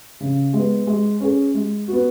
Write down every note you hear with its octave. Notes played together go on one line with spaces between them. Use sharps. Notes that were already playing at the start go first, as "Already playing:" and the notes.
C#3
G#3 B3
G#3
C#4 G#4
G#3
B3 F#4